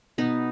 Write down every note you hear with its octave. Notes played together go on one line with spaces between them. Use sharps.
B2 B3 D#4